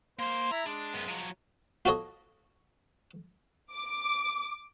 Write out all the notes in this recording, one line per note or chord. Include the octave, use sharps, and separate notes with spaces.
A#3 C5
E4 A#5
G#3 D4
F#2 B3
F3 F#3
F4 F#4 A4 C#5 D#5
D6